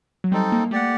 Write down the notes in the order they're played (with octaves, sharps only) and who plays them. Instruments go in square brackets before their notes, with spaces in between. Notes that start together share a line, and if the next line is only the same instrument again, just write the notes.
[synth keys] F#3
[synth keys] G3 [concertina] C4 D#4 A4
[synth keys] A#3
[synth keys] A3 [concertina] G4 D5 F#5